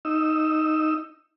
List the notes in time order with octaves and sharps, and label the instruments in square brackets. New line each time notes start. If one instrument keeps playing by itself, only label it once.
[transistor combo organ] D#4 E6